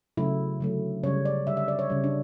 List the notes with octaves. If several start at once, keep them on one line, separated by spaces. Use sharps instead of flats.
C#3 F#3 A3 E4
D3 F#3 A3
C#3 G3 C#5
D5
D3 G3 E5
E5
D5
C#5
C#3 G3
D4